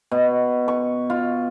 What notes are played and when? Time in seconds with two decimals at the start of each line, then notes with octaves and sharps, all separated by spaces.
0.11 B2
0.68 C#6
1.10 F4